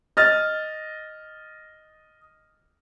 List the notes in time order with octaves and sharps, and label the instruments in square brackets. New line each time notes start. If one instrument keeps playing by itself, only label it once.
[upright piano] D#5 F6 A6